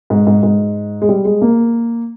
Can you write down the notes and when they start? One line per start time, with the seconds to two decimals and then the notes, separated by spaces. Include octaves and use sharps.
0.10 G#2
0.27 G#2
0.43 G#2
1.02 G#3
1.09 G3
1.25 G#3
1.42 A#3